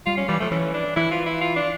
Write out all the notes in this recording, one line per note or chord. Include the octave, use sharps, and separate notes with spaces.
G3 F4
C#4
E3 G3
F3 A3
E3 C#4
D4
E3 E4
F4
E4
F4
D4